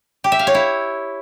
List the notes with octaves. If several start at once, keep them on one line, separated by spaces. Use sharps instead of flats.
G4
E5
F5
C#5
E4